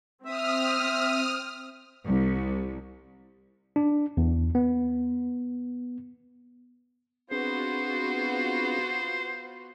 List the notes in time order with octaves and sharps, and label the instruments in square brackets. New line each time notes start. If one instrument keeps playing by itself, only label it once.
[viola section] C4 [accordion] E5 [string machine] D#6 F6
[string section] C2
[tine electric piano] D4
E2
B3
[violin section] B3 F4 F#4 [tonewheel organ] C4 D4 G#4 [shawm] C5